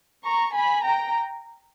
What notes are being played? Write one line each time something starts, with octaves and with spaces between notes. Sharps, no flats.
A#5 C#6
G#5 B5
G5 A#5